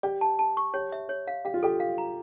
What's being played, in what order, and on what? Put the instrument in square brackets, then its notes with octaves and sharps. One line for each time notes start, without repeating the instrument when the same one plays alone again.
[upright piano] G4 [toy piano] D5
[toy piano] A5
A5
C#6
[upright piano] G4 [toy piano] C#5
[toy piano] E5
C#5
F5
[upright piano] G4 [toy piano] F5
[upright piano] F4
[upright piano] G4 [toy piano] A4
[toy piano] F5
A#5